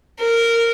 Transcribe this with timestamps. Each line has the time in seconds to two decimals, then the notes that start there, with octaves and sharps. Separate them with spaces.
0.20 A#4